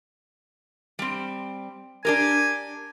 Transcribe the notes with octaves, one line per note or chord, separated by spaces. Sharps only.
G3 C4
D4 G4 A#4 G#5